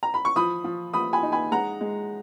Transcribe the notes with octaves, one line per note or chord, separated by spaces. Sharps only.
A#5
B5
C#6
F3 B5 D#6
F3
F3 B5 D#6
G#5 B5
D#4
G#5 B5
G#3 F#5 A#5
G#3